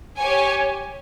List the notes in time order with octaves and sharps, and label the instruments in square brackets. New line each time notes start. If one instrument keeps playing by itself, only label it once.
[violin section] G4 C#5 G#5